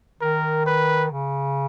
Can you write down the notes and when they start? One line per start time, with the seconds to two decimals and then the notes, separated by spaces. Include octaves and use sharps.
0.21 D#3 A#4
0.66 B4
1.11 C#3